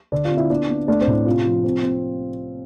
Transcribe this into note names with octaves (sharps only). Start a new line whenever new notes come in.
D3 D4 D5
F4 F5
C4
E4 E5
B3 D4 D5
B3
A3 D4 D5
C4 C5
A2
C3 F4
F3
C4
C4